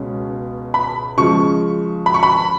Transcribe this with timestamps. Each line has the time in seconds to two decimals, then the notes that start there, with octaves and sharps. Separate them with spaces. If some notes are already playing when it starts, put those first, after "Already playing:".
Already playing: C#2 B2 G#3 C#4
0.74 B5
1.18 C#3 F3 G#3 C#6
2.06 B5
2.14 C#6
2.23 B5